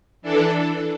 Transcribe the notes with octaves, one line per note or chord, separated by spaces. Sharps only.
E3 D4 A4